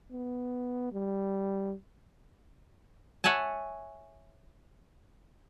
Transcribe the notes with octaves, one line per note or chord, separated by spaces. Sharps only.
B3
G3
C#5 E5 F#5 G#5 A5